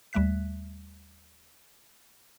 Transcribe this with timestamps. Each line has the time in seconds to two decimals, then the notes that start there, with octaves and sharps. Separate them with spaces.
0.13 D#2 G3 A3 E5 F#6 B6